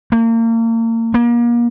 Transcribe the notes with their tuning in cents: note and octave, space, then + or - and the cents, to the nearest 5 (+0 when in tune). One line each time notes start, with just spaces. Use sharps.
A#3 -35
A#3 +35